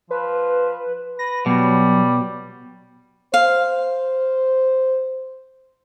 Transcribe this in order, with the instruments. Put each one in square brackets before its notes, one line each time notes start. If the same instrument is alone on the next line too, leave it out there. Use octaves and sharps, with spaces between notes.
[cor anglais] F3 [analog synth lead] B4
[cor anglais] B4 [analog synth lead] A#6
[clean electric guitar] B2 [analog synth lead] F#3 [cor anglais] G3
[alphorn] C5 [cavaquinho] F5